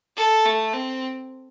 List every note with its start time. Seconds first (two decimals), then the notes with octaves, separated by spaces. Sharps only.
0.17 A4
0.46 A3
0.74 C4